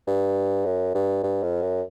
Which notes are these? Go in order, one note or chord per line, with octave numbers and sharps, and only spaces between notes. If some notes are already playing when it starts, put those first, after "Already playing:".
G2
F#2
G2
G2
F2
F#2